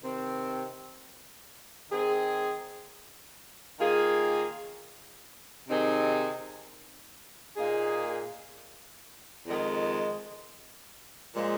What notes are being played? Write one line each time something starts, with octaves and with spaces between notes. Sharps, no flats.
C3 D#3 C4
D#3 C4 G#4
D#3 A#3 F4 G#4
C3 D#3 C4 D#4 G#4
A#2 A#3 D#4 G#4
F2 D#3 G#3
A#2 F3 G#3